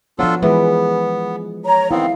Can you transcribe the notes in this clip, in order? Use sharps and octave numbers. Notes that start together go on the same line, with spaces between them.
F3 F#3 B3 D4 F4 A4
E3 G#3 B3 G#4
C#5 A#5
D#3 B3 C4 E4 F5